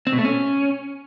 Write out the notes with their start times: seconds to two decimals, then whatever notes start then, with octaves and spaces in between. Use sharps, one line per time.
0.07 C4
0.13 B2
0.19 A3
0.25 C#4